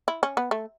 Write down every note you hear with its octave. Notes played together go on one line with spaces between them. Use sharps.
E4
C#4
B3
A3